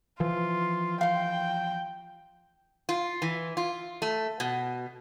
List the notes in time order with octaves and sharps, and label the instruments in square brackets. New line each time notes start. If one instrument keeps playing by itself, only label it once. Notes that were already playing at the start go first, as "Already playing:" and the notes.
[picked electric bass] E3 F3 [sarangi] F4
[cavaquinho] F5 C6 [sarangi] G5
[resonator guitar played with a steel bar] F4
E3
F4
A3
B2